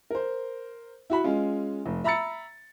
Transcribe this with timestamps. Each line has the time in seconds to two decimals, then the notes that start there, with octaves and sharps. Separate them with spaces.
0.10 A#4 C5
1.10 E4 F#4 B5
1.24 G#3 C#4 F4
1.86 F1
2.04 E5 A#5 B5 E6 A6 C#7